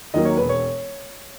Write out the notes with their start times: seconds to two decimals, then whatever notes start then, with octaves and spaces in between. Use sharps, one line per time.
0.14 D#2 D#3 F#3 A#3 D#5
0.25 C#5
0.37 E1 B4
0.49 C#5